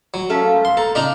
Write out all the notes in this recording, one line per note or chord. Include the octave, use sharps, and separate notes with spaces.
F#3
F3 A3 A#3 C#4 A4
G#3 D#4 F4
C6
A4 A#5
C#3 D4 D#4 A4 F5 A#5